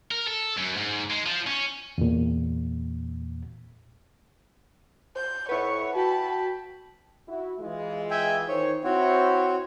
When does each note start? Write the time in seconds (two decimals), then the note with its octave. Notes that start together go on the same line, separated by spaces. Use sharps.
0.11 A#4
0.28 A4
0.58 F#2
0.76 G#2
1.10 G#3
1.26 F3
1.47 C#4
1.98 E2 A#2
5.16 C5 G6
5.49 F2 E4 B4 C#5 F#5 C#6
5.95 F#4 G5 A5 B5
7.28 E4 F#4
7.60 E3 G#3 F4
8.11 E5 G5 G#5
8.48 D#3 C5 C#5
8.84 C4 E4 F#4 C5 C#5